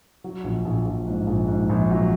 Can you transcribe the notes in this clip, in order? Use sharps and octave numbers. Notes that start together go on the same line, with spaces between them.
F#3
A#1
A#1
A#1
G#2
A#1
G#2
A#1
F#3